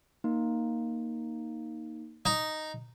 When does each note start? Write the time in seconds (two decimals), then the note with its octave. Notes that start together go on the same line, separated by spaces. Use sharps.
0.24 A#3 D#4
2.25 D#4